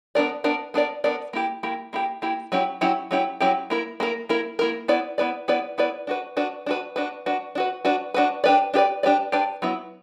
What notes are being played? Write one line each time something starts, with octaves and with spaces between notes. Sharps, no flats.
B3 D4 A#4 D5
B3 D4 A#4 D5
B3 D4 A#4 D5
B3 D4 A#4 D5
A#3 E4 G4
A#3 E4 G4
A#3 E4 G4
A#3 E4 G4
F#3 C#4 E4 G4
F#3 C#4 E4 G4
F#3 C#4 E4 G4
F#3 C#4 E4 G4
A#3 E4 A#4
A#3 E4 A#4
A#3 E4 A#4
A#3 E4 A#4
B3 E4 B4 D5
B3 E4 B4 D5
B3 E4 B4 D5
B3 E4 B4 D5
D4 F#4 B4
D4 F#4 B4
D4 F#4 B4
D4 F#4 B4
D4 F#4 B4
D4 F#4 B4
D4 F#4 B4
D4 F#4 B4
D4 G4 B4 D5
D4 G4 B4 D5
D4 G4 B4 D5
D4 G4 B4 D5
F#3 B3 E4